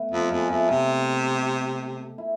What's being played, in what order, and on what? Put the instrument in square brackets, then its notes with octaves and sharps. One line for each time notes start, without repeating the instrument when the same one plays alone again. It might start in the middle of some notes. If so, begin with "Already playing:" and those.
Already playing: [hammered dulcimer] A3 B3
[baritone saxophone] F2
[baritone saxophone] F2 [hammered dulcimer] G#3
[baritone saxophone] F2 [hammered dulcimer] A3
[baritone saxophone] C3
[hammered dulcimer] E4